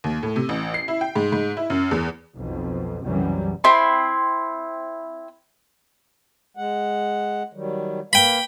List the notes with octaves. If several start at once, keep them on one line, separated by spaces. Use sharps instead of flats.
D#2
A2
C3
A1
C7
E4
G5
G#2
G#2
E4
F#2
E2
B1 F2 B2
C2 F#2 C#3 E3 F#3 G3
C4 E4 C6
G#3 F#5
D#3 F#3 G3
A#3 B4 F5 G5 B5